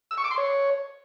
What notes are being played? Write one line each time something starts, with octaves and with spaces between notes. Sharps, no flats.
E6
C#6
D6
C6
C#5